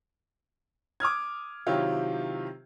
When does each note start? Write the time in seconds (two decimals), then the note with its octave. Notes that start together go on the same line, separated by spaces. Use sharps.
1.00 D6 D#6 F6 G#6
1.66 C3 D#3 F#3 E4 F4 G4